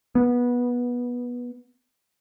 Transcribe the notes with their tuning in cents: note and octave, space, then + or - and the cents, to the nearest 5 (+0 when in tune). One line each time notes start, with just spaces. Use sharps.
B3 -15